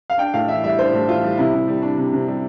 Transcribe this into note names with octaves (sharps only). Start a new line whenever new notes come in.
F5
D4 G5
A2 F5
E3 E5
G3 E5
D4 C5
A2
E3 F4
G3
C3 E4
C3
G3
D4
C3
C3
G3